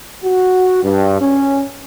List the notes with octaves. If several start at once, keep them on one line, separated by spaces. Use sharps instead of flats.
F#4
G2
C#4